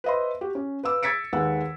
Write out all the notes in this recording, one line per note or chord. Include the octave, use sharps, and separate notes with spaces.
B4 C5 D#5 E5 C6
F#4 G4
C#4
B4 F5 D6 E6
E6 G#6 A6 B6 C#7 D7
D#2 G#3 B4 F#5 E6